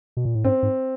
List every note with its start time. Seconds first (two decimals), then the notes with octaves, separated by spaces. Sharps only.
0.17 B2
0.25 A#2
0.35 A2
0.45 G#2 C4
0.63 G#2